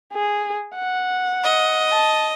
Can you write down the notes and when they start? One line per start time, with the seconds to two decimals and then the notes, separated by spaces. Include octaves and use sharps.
0.13 G#4
0.75 F#5
1.44 D#5
1.92 A5